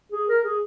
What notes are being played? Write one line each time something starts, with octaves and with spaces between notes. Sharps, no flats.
G#4
A#4
G#4